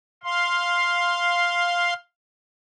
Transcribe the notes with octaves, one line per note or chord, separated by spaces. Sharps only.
F5 C6